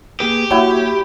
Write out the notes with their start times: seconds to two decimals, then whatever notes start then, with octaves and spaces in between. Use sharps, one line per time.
0.20 A#3 G4 G#4 B4
0.51 F#3 A#3 E4 F#4 C#5 G5